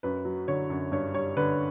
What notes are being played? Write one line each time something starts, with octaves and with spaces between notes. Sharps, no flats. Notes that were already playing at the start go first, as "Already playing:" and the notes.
F#2 B4
F#3
D3 C#5
F#2
G2 C#5
G3 C#5
D3 B4